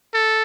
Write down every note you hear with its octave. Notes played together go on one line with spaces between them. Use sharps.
A4